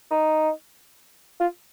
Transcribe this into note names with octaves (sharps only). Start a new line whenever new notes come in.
D#4
F4